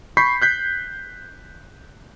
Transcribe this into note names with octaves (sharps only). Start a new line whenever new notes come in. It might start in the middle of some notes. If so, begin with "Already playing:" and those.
B5 C#6 G6 B6 C7
F#6 G6 B6